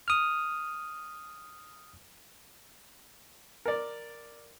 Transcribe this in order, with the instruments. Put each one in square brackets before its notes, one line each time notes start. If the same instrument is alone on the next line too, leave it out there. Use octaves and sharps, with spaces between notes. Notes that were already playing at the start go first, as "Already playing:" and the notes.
[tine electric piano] D#6 F6
[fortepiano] A#4 D5